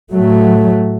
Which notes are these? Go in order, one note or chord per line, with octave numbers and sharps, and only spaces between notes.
A2 F#3 A3